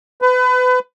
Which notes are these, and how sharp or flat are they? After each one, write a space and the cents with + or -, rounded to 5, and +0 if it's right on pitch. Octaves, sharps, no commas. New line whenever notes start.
B4 +30